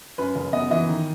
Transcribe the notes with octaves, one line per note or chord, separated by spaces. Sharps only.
F#2 B4
F#1
B3 D#5
E3 D#5
D#3